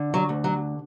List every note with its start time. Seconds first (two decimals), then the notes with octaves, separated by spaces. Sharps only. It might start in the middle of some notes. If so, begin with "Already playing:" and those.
Already playing: D3
0.14 F#3
0.29 D2
0.44 F#3